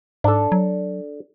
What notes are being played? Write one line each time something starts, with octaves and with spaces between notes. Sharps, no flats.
G#2 D4 A4
F#3